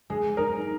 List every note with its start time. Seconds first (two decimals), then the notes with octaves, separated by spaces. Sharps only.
0.10 G#3 G#4
0.37 D#4 A#4